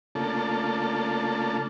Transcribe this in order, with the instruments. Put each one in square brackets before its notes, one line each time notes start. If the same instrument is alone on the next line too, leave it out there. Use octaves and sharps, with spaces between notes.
[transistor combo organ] C#3 A3 A#3 D4 F4 A4